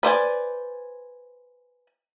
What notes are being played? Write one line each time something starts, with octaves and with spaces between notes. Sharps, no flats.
B4 C5 D5 G#5